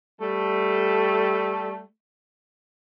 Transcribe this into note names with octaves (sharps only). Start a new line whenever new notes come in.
G3 A3